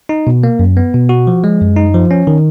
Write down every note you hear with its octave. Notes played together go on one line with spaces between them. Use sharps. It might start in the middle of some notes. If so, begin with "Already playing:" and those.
D#4
B2
A#3
F#2
B3
B2
F#4
F3
G#3
F#2
D#4
F3
C#4
D#3